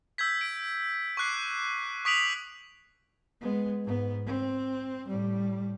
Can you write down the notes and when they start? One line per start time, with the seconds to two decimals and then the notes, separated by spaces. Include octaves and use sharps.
0.18 E6 G6 G#6 B6
0.41 D7
1.17 C#6 D6 F#6 C7
2.05 C#6 D#6 B6 D7 F7 F#7
3.41 G#3 B3
3.84 G#2 B3
4.26 C4
5.08 A2 G3